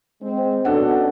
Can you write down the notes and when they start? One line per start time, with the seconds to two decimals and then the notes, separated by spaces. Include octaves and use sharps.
0.21 G#3 C4
0.65 B2 C#4 D4 A4 F#5